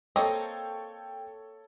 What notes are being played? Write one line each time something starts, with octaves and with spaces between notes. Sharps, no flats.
A#3 C4 A4 C#5 D#5 G5